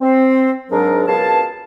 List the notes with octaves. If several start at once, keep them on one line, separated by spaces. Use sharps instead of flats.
C4
G#2 F#3 D4 A#4
C#2 B2 A#4 C#5 F5 A5